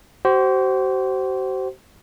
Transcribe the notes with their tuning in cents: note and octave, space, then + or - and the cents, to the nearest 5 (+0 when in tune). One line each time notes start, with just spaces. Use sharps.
F#4 +45 C5 +0